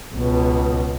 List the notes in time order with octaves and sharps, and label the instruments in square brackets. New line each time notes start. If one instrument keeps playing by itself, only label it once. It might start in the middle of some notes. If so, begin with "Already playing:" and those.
[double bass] C#2 B2